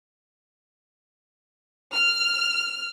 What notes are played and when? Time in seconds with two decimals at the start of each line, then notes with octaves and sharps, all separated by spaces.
1.94 F6